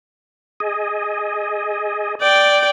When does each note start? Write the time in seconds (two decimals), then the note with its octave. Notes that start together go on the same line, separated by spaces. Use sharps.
0.60 G#4 D#5
2.21 D5 G5